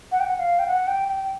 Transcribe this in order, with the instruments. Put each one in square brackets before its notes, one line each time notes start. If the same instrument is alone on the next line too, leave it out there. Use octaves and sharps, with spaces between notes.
[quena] F#5
G5
F#5
F5
G5
F#5
G5
G5